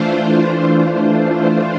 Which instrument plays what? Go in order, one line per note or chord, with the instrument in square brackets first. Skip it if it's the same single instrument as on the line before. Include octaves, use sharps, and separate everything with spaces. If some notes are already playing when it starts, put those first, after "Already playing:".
Already playing: [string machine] E3 A3 D4 F4 C5